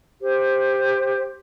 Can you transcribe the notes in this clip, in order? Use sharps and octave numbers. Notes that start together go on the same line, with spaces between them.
G4 C5